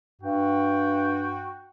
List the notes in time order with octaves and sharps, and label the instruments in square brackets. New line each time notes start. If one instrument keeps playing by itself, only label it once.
[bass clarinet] G2 [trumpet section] F#4 G5